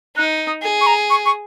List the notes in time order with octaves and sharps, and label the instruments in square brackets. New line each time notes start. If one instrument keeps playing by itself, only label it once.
[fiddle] D#4 [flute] F#6
[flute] D#6
[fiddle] G#4
[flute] C#6
A#5
C#6
C#6